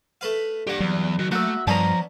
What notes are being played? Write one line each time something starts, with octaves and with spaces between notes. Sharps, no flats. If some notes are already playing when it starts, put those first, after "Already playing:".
A3 B4 F5
G2 A#3 G4 F#5
E2 F#3
D#3 F#4
A3 A#3 F#4 E5
G2 F3 G3 B3 C#4 D4 A5 A#5